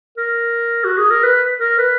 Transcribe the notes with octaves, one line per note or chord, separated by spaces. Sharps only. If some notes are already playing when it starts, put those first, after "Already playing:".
A#4
F#4
G#4
A#4
B4
A#4
B4